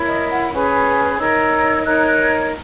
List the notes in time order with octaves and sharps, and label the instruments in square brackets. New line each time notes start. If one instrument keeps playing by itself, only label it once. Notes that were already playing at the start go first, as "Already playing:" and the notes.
Already playing: [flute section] E4 A#4 C#5
D#5
F#5
C#4 G#4 B4
D#4 A#4 C#5 E6
D#4 A#4 C#5 F#6
F#6